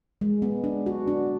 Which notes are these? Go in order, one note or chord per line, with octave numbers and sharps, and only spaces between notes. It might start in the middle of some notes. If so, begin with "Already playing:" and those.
G#3
B3
D4
F#4
D4